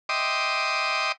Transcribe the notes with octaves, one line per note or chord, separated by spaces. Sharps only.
D#5 E5 G5 C6 D6 D#6